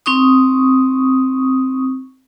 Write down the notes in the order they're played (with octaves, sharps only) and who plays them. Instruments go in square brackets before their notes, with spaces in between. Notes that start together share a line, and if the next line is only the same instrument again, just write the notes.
[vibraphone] C4 D#4 C#6 D#6